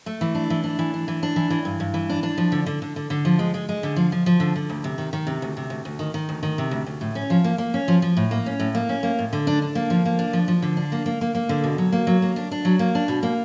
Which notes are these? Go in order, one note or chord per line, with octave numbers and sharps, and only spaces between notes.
A3
E3
D4
E3
D4
E3
D4
E3
D4
E3
E3
G2
G2
E3
D4
D4
F3
D3
D3
D3
D3
D3
F3
G#3
G#3
G#3
D3
F3
F3
F3
D3
D3
D2
C3
D#3
D#3
C3
D2
C3
D2
D2
D#3
D#3
D2
D#3
C3
D2
D2
A2
C#4
F3
A#3
A#3
C#4
F3
F3
A2
A#3
C#4
A2
A#3
C#4
A#3
A2
D3
D4
D4
A#3
F3
A#3
D4
F3
F3
D3
D4
A#3
A#3
A#3
A#3
D3
B2
F#3
A#3
F#3
A#3
D4
D4
F#3
A#3
D4
B2
A#3